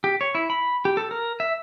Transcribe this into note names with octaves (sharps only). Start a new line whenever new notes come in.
G4
C#5
E4
B5
G4
A4
A#4
E5